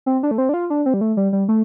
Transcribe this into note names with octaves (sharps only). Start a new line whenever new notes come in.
C4
D4
A3
C4
D4
F4
D4
C4
G3
A3
G3
G3
A3